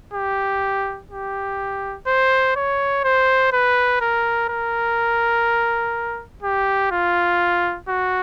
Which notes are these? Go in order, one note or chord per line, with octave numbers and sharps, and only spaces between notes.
G4
G4
C5
C#5
C5
B4
A#4
A#4
G4
F4
F#4